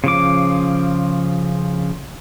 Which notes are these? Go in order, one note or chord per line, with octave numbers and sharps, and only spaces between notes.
C#3 F3 D6